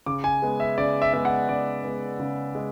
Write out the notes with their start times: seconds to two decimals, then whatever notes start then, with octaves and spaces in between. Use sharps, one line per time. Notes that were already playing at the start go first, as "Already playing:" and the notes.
0.06 C#3 D6
0.24 G#5
0.42 G#3 B3
0.60 E5
0.78 C#3 D5
1.02 E5
1.13 G#3 B3 E5
1.25 F#5
1.48 C#3 D5
1.84 G#3 B3
2.20 C#3
2.55 G#3